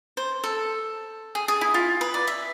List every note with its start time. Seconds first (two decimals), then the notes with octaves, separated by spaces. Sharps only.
0.17 C5
0.44 A4
1.35 G#4
1.48 G#4
1.61 E4
1.74 F4
2.01 B4
2.14 D5
2.27 E5